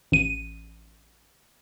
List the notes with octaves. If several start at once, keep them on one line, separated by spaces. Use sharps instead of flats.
A1 D#7